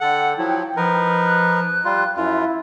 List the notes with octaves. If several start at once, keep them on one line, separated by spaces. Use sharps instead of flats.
D3 A4 F#5 G5
F3 F#3 E4
F3 D#4 A#4 B4
F#6
G3 F4
F#2 E4 F4